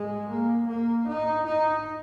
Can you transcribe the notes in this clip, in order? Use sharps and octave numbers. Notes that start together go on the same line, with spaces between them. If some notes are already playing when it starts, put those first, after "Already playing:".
Already playing: G#3
A#3
A#3
D#4
D#4